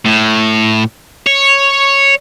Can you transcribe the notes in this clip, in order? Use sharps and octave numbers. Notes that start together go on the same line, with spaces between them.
A2
C#5